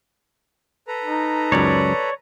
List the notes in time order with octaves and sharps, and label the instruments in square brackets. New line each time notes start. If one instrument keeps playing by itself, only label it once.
[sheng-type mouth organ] A4 B4 A#5
[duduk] D#4
[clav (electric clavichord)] C#2 F#2 [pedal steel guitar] C#5 D5